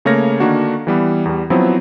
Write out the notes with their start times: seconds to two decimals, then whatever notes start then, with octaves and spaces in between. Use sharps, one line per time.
0.05 C#3 A3 A#3 C#5 F6 A#6
0.40 D3 D#3 A#3 D4 F#4
0.87 E3 G3 B3
1.25 E2 G3
1.50 F3 F#3 B3 C4 E4